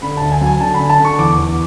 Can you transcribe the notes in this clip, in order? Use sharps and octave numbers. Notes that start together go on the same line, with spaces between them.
D3 B5
D2 A5
G#5
F#3
G#5
D3 A5
B5
D3
A5
D3 C#6
E2 D6
E2